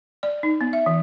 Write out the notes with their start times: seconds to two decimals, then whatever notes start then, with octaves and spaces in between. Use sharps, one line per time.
0.23 D5
0.43 D#4
0.61 B3
0.73 E5
0.86 E3